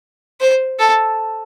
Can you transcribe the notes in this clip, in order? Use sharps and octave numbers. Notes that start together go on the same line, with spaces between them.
C5
A4